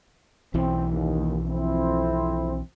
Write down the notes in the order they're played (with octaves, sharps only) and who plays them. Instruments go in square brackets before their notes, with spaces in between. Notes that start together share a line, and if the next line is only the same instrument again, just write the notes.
[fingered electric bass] B1 E3 [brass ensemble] C4
[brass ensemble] D#2
F2 C4 E4